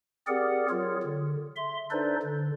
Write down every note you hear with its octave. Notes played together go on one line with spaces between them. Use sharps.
C4 G4 G#4 A#4 D5 F#5
F#3 F4 G#4 A#4 C#5
D3
E5 C6
D4 D#4 A4 B4 C5 D5
D3